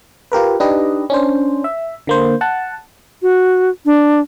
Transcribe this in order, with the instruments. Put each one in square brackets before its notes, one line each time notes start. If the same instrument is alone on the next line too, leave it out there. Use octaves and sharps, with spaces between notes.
[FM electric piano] F4 G4 A#4 B4
D4 D#4 G4 B4 D#5
C#4 D4 C5
E5
D3 A#3 C5
F#5 A5
[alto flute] F#4
D4